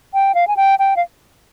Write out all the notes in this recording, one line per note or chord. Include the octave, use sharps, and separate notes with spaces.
G5
F5
G#5
G5
G5
F5